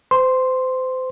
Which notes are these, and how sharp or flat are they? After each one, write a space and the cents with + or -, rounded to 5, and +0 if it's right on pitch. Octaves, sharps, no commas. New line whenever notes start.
C5 -30 C6 +0